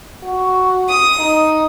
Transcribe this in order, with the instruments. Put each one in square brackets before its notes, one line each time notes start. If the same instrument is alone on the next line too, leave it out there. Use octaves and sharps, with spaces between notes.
[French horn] F#4
[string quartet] D#6
[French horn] D#4